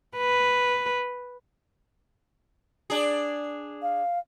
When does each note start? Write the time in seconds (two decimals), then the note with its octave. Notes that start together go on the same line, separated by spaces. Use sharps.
0.17 B4
2.90 D4 G#4
3.82 F5